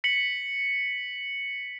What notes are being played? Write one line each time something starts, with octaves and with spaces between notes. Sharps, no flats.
B6 C#7 F#7